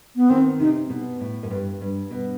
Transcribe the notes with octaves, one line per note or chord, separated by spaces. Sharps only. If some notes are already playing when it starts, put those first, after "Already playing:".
B3
D#3 C4
C3 D#4
B2
A2
F#2
G2
G2
B2